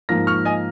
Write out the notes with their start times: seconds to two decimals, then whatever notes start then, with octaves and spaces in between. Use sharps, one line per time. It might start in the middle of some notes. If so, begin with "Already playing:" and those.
0.09 G#2 F3 A#3 F6 A#6
0.27 C#6 F6
0.45 D#5 G#5